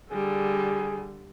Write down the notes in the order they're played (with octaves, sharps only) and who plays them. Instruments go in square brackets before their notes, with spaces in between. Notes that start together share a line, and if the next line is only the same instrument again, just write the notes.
[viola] D3 G3 [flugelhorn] G#4